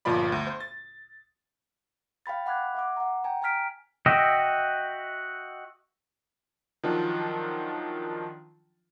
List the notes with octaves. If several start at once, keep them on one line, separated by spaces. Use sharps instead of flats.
G1 A#2 F3 F4 D5 B5
D2
C5
A6
F5 G5 B5 A6
F#5 B5 D6 F#6 G#6
E5 F#5 D6
F#5 A#5
G5 G#5 A#5
G5 G#5 A#5 F6 B6 D7
F#4 D#5 E5 G5
D#3 F3 F#3 D4 F4